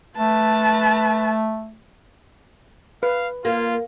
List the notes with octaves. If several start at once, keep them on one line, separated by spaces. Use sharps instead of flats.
A3 B4 A5
B4 F5
A#3 F4